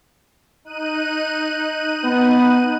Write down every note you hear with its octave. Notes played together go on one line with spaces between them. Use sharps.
D#4 F#6 D#7
B3